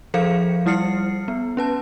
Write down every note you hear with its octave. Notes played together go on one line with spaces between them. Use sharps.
F3 G#4 A4 C5 F5 C#7
G3 E4 F6 C7 C#7
B3
C#4 B4 A5